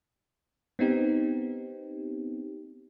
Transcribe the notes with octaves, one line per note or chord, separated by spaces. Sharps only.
B3 C4 D#4 G4